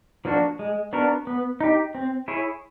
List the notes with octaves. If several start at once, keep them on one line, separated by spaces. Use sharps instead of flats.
F3 A#3 D4 F#4
G#3
B3 D4 F#4 A#4
B3
D#4 G4
C4
E4 G#4 C#5